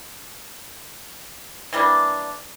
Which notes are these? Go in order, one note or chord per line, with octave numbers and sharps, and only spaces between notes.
E3 G3 A#3 D4